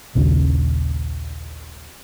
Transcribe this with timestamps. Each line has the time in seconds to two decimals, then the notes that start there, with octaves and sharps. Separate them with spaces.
0.15 A#1 D#2 C#3